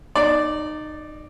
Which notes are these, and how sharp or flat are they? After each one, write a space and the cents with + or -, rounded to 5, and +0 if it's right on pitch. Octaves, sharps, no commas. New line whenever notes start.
D#4 -25 D5 +0